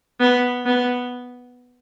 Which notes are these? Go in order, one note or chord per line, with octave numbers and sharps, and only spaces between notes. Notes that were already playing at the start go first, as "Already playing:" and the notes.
B3
B3